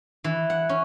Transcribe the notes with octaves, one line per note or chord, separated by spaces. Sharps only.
E3
F#5
C#4